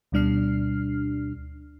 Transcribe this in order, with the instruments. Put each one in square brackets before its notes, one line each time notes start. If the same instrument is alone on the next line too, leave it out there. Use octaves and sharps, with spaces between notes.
[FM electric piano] D2 B2 G3 D4 F6 C7